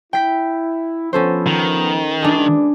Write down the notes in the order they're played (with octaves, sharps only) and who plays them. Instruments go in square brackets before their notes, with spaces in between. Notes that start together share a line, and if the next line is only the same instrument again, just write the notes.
[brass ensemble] E4 [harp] G5 B6
[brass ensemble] F3 B3 [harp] C#4 A4 C5
[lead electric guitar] D#3
[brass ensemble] G#1 E3 D5 [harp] D4 G#4